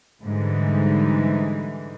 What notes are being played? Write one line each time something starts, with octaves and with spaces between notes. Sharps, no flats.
G#2 D3 E3 G3 D#4